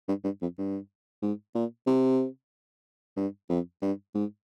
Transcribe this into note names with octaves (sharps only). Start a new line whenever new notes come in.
G2
G2
F2
G2
G#2
A#2
C3
G2
F2
G2
G#2